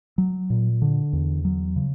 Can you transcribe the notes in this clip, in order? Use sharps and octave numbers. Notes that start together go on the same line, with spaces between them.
F#3
A#2
D3
E2
F#3
C#3